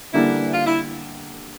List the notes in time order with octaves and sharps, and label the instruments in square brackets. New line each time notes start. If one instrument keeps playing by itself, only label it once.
[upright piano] D3 G3 A#3 D4 [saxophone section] E3 E4
[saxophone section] F4
E4